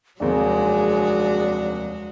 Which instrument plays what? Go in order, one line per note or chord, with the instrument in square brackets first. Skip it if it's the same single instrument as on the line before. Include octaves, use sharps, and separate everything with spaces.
[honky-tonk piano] F1 D#2 C4 [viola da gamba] F#3 G#3 F#4 [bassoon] D4 [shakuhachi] G#4